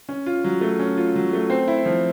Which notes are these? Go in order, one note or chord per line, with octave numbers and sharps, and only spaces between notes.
C#4
F4
F#3
A3
C#4
F4
F#3
A3
C4
E4
F3